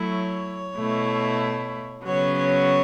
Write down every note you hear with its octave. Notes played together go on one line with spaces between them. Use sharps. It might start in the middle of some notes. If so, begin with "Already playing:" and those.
Already playing: F#3 A3 E4
C#5
B2 A3 E4
C#3 F#3 B3 C#5
C#5